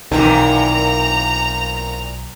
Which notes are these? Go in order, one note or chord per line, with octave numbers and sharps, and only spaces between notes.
B1 A#2 D#3 E3 C4 A#5